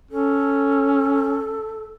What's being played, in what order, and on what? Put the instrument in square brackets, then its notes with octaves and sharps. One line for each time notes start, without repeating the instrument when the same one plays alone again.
[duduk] C#4 [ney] A4